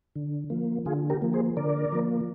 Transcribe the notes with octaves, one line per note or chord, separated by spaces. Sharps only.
D3
F3 A#3
D3 F4 G#4
G4 A#4
F3 A#3
G#4 C5
D3 A#4 D5
F3 A#3